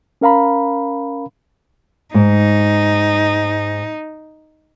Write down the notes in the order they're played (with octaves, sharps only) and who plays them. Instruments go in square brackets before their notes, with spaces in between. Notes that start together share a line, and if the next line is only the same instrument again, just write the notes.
[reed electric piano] C#4 A#4 F5 A#5 B5
[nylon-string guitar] G#2 [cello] D#4